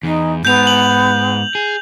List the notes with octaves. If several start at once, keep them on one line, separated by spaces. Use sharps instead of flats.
E2 D#4
G#2 B3 G6 F7
F#7
G#4